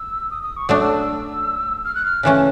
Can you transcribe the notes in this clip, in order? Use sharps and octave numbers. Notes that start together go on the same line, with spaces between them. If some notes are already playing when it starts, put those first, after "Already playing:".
Already playing: E6
D#6
D#6
C#6
F#3 A3 D4 D#6
E6
E6
F6
F#6
F6
C#3 E3 A3 C#4 F#6